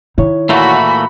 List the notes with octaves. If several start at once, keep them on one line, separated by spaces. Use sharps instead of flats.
D#3 D#4 E4 C#5
A#2 E3 A3 F#4 B5